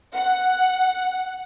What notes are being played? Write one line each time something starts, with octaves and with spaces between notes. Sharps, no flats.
F#5